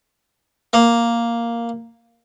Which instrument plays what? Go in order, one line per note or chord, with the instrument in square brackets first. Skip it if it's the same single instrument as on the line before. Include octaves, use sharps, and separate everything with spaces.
[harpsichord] A#3